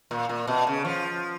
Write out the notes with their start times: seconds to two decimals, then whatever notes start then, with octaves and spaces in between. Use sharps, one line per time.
0.11 A#2
0.29 A#2
0.47 B2
0.67 C#3
0.85 F3